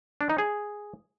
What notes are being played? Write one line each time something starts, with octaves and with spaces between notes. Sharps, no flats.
D4
D#4
G#4